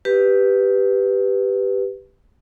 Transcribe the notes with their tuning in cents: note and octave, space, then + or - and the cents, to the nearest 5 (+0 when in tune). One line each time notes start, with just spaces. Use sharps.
G4 +0 B4 +0